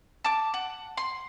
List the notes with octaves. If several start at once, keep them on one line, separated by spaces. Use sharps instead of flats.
A5 D6
F#5
C6